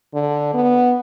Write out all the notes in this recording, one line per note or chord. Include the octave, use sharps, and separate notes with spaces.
D3
B3